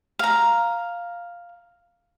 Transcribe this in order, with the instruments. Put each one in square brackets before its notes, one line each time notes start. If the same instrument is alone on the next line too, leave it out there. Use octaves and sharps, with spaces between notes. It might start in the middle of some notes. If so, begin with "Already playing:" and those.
[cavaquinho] F5 A#5